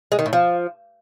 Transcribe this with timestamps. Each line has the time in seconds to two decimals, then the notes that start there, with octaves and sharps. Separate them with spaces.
0.12 G#3
0.19 D#3
0.26 A2
0.33 F3